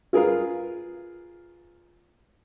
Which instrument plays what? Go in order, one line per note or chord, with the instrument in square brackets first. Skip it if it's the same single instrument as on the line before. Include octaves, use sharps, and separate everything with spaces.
[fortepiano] F4 G#4 A#4 B4 F5